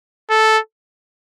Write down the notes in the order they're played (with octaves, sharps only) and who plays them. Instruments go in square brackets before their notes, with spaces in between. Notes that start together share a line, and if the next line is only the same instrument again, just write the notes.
[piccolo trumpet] A4